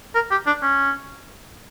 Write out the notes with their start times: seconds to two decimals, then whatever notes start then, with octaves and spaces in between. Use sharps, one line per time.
0.15 A#4
0.31 G4
0.47 D4
0.62 C#4